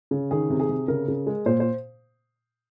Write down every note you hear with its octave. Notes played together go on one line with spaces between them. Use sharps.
C#3
D#3 G#4
C3
G#4
C3
C#3 A#4
C#3
G#3
A#2 C5
C5